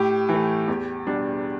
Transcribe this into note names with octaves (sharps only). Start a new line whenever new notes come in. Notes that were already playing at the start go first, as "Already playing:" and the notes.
Already playing: A2 G4
E3
A3
E2
B2 G3 D4